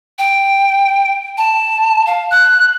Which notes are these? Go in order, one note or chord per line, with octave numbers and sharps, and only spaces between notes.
G5
A5
F5
F#6